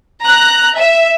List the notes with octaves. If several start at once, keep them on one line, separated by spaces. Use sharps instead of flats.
A#5 F#6
E5